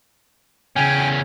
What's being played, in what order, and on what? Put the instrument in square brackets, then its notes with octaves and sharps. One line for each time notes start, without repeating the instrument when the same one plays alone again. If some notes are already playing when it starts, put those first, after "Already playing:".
[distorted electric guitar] E2 C#4 [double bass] C#3 [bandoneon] G5 G#5